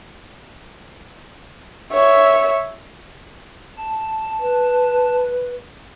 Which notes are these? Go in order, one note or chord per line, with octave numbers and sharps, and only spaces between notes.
C#5 E5
A5
B4